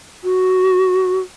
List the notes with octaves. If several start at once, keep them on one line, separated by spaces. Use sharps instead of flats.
F#4